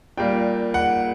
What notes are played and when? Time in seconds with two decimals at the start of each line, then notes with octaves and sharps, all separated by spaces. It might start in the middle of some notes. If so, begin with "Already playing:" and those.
0.17 A#2 G3 A#3 G5
0.74 F#5